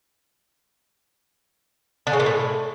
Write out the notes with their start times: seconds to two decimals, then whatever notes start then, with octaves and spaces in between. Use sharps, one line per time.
2.07 D3
2.13 C#3
2.20 A#2
2.26 A2